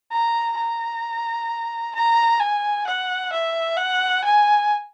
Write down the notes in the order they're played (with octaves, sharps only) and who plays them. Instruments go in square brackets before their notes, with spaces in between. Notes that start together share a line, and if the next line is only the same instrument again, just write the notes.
[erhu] A#5
A#5
A#5
G#5
F#5
E5
F#5
G#5